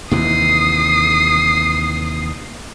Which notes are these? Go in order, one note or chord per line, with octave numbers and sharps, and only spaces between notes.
D#2 C3 E3 D#6 C7